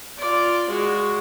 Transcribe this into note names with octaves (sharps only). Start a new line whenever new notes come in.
F4 D5
G#3 F#4